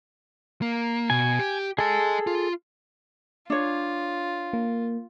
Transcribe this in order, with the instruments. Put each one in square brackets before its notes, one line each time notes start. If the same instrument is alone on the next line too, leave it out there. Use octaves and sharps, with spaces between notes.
[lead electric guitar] A#3
[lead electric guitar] B2 [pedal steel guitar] G#5
[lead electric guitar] G4
[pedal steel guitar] G#4 A4 [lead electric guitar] D#5 G#5
[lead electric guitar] F4
[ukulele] D4 C#5 [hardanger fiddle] F4
[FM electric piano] A#3